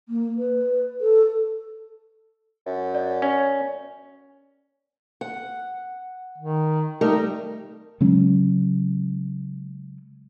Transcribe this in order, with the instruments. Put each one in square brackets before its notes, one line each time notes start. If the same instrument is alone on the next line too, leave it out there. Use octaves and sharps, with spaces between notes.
[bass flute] A#3
B4
A4
[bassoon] F#2
[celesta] D5
[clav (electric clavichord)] C#4
[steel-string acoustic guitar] F#5
[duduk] D#3
[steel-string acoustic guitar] G3 A3 A#4 [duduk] D#4
[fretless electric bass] C#3 F#3 G#3 C#4